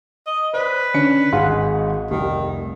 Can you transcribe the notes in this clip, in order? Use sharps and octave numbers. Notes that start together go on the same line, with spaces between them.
D#5
B4 C5 D5
D3 C#4 D4 C#7
G#1 G#2 G#4 F5 F#5 C6
F1 C2 D#3